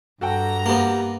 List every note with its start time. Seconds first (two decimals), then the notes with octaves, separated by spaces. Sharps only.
0.21 G2 F#4 A4 G5 A#5
0.66 A#3 B3 G4